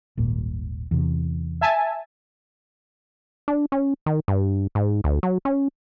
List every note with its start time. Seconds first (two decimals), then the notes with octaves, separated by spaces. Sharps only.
0.17 D#1 G#1 A#2
0.91 E2 C3
1.61 E5 G#5 A5
3.48 D4
3.72 C#4
4.06 D#3
4.28 G2
4.75 G#2
5.04 D2
5.23 F#3
5.45 C#4